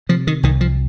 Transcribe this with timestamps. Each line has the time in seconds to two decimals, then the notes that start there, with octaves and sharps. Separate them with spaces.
0.09 C3 F3
0.27 D#3
0.43 C2 D#3
0.61 F3